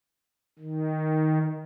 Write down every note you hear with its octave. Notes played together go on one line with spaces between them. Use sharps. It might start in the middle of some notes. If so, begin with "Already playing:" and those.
D#3